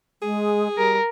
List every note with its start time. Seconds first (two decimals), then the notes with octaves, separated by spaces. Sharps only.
0.22 G#3 G#4
0.78 G3 A#4